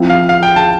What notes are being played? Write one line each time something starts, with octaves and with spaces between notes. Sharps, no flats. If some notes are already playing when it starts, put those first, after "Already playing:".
Already playing: F3 C4 E4
F5
F5
G5
A5